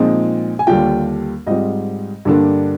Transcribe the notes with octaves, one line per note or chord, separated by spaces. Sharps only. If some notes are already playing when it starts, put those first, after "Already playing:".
Already playing: A#2 F3 G#3 C4 D#4
G#5
D#2 D3 G3 D4 F4 G5
G#2 G3 C4 F4 D#5
G2 D3 G3 A#3 D4